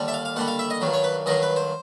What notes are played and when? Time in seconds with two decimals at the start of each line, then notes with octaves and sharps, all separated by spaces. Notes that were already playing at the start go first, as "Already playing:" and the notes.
Already playing: D#2 D3 G3
0.08 E5
0.14 F5
0.25 F5
0.36 D#2 D3 G3 F#5
0.48 F5
0.59 E5
0.70 D#5
0.81 G2 D#3 F#3
0.93 C#5
1.04 B4
1.26 G2 D#3 F#3 D#5
1.42 B4
1.56 C5